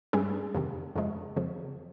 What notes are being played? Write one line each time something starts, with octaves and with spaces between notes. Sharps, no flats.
G2 G3 C#4 G#4
F2 C3 D#3
F2 C#3 F3 G#3
F2 C#3 F3